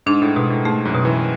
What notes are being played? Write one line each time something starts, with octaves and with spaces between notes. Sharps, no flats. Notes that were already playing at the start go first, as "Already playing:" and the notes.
G#2 D4
A2
G#2 B2
A2
G#2 A3
F#2
B2
E3